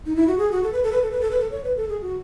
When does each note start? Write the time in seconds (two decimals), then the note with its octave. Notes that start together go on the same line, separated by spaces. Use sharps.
0.06 D#4
0.16 E4
0.28 F#4
0.38 G#4
0.52 F#4
0.64 A4
0.73 B4
0.83 A4
0.92 B4
1.02 A4
1.12 B4
1.21 A4
1.31 B4
1.40 A4
1.52 C#5
1.64 B4
1.77 A4
1.89 G#4
2.02 F#4